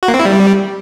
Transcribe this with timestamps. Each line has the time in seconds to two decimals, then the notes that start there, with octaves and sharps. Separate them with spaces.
0.03 F#4
0.08 A#3
0.14 C4
0.20 E4
0.25 G3